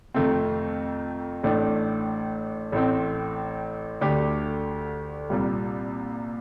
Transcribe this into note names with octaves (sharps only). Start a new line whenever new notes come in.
F2 C3 D#3 A3 C4
A1 A2 A3 D4
A1 A2 A3 C4
D2 D3 A3 D4 G4
C2 A#2 G3